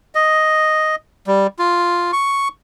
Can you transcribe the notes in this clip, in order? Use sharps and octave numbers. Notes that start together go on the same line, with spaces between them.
D#5
G3
F4
C#6